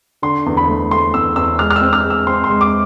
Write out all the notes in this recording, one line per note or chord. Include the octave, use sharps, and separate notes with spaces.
D3 C6
E2
B5
A3
A3 C6
E2 E6
E2 E6
G#3 F6
F6
E6
C4
F6
G#3
E6
C4 C6
C6
G#3
D6